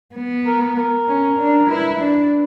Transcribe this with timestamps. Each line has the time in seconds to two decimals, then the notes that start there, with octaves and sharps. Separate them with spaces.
0.15 B3
0.46 A#4
0.62 A#4
0.77 A#4
1.08 C#4
1.39 D4
1.69 E4 B4
2.00 D4